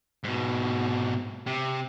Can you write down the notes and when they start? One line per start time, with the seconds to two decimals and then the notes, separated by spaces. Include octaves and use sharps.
0.24 G#2 B2
1.47 C3